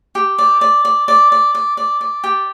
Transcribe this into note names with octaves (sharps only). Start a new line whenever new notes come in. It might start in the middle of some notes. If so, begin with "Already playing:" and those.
G4
D5
D5
D5
D5
D5
D5
D5
D5
G4